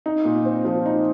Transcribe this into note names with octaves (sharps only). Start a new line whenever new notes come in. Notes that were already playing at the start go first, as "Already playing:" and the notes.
D#4
A#2
C4
F3
D#4